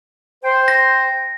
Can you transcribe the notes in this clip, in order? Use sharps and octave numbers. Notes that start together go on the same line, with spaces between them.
C5 G5
A#6